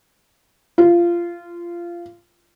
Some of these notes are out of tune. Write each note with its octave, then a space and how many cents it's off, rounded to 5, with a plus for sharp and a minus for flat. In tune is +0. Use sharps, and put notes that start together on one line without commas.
F4 -20